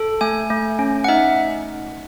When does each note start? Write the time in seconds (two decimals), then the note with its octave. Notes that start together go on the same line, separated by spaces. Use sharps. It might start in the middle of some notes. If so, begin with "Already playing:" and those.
Already playing: A4
0.21 A3 G#5
0.50 A3
0.79 C#4
1.04 F#5
1.08 D#4 E5